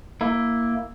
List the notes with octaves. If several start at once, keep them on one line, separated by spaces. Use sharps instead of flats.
A#3 E4